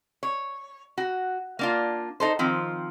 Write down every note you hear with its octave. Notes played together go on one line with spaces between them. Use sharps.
C#5
F#4
A#3 D4 F4
D#4 A4 C5
D#3 F3 C4